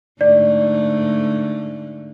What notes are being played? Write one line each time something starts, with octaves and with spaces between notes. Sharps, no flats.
G#2 D3 A3 D5